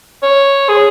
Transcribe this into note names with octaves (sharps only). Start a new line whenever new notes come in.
C#5
G#4